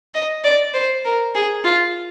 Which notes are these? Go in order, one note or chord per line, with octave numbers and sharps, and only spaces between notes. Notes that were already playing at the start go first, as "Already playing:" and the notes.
D#5
D5
C5
A#4
G#4
F4